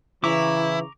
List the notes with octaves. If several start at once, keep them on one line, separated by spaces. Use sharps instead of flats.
C#3 E3 E4 A#5 C#6 D6